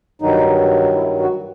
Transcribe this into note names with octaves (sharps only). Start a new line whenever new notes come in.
G2 D#3 F#3 D#4
E4
F#4